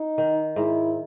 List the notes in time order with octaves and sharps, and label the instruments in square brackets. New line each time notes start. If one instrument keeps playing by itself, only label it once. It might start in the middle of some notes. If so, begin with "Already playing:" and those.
Already playing: [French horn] D#4
[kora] D#3
[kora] G#2 [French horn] E4